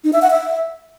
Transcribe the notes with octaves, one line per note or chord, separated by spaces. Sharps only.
D#4
E5
F#5
E5